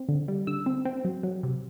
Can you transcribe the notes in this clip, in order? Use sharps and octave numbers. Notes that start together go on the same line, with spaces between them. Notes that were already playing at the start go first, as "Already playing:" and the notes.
Already playing: C4
D3
G3
D3 E6
C4
C4
F#3
F#3
C3